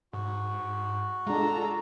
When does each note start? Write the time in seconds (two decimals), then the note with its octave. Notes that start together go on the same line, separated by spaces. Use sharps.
0.13 G#2 F#4
1.27 G#3 D4 F4 A4 A#5